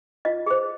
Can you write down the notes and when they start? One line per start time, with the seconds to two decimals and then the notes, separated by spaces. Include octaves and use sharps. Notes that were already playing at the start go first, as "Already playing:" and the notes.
0.25 F4 D#5
0.46 G#4 C5